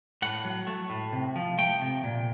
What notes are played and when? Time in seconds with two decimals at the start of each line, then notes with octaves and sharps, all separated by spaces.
0.22 A2 F#5
0.45 F#3
0.67 A3
0.90 A2
1.13 C3
1.36 F3
1.58 A3 G5
1.82 C3
2.04 A#2